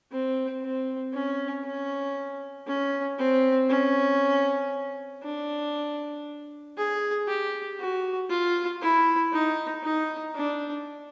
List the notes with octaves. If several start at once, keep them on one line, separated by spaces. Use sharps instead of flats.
C4
C4
C#4
C#4
C#4
C4
C#4
D4
G#4
G4
F#4
F4
E4
D#4
D#4
D4